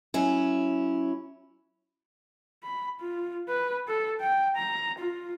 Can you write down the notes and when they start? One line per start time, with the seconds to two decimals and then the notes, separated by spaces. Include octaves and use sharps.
0.14 F#3 C#4 E4
2.64 B5
3.00 F4
3.48 B4
3.88 A4
4.21 G5
4.56 A#5
4.99 F4